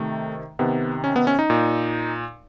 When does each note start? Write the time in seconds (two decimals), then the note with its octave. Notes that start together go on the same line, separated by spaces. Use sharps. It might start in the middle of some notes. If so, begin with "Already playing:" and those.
Already playing: C3 D#3 A3
0.59 C3 D#3 B3
1.04 C#4
1.16 B3
1.27 C#4
1.39 D#4
1.50 A#2